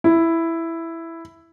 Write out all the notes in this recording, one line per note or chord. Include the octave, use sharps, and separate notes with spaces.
E4